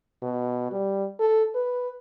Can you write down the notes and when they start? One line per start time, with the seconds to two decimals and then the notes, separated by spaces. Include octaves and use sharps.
0.22 B2
0.72 G3
1.20 A4
1.55 B4